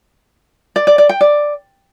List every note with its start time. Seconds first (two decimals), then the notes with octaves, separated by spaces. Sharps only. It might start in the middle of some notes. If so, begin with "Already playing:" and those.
0.76 D5
0.87 D5
0.98 D5
1.09 G5
1.21 D5